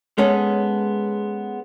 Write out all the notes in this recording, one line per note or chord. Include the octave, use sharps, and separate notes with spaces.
G#3 B3 C#4 A4